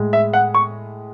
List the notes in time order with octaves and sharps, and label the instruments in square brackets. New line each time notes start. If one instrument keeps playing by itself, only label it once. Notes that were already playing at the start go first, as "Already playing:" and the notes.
Already playing: [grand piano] A2 G#3
E5
F#5
C#6